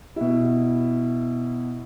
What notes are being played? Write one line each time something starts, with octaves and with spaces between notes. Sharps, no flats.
B2 E4